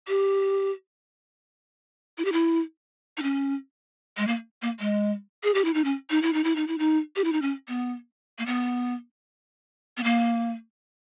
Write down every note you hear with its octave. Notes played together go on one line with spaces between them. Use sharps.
G4
E4
G4
E4
D#4
C#4
G#3
A#3
A#3
G#3
G#4
G4
E4
D#4
C#4
D#4
E4
D#4
E4
D#4
E4
D#4
G4
E4
D#4
C#4
B3
A#3
B3
B3
A#3